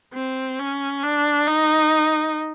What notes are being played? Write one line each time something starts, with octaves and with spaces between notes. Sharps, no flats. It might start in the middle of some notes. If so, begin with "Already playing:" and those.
C4
C#4
D4
D#4